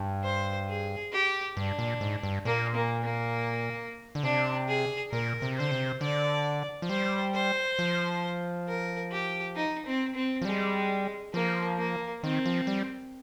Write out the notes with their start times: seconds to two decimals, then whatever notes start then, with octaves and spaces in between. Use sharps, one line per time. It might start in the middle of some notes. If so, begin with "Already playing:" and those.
Already playing: G2
0.24 C5
0.68 G#4
1.13 G4
1.57 G2 D4
1.79 A#2
2.01 G#2
2.23 G2
2.45 A#2 A#3
2.75 A#3
3.04 A#3
4.15 D3
4.23 C3 D4
4.68 G#4
5.12 A#2 A#4
5.42 C3
5.57 D3 C5
5.71 C3
6.01 D3 D5
6.82 F3
6.89 G3 C5
7.34 C5
7.79 F3
8.68 A#4
9.12 G4
9.56 D#4
9.86 C4
10.15 C4
10.42 F3
10.45 G3 G#3
11.34 F3 A#3
11.79 A#3
12.22 D#3 C4
12.46 F3
12.67 G3